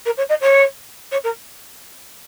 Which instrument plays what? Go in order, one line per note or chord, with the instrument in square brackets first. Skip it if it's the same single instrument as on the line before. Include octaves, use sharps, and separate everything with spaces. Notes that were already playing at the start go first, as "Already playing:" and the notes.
[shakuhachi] A#4
C#5
D#5
C#5
C#5
A#4